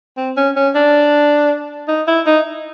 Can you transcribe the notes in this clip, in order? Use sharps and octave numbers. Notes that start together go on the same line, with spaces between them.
C4
C#4
C#4
D4
D#4
E4
D#4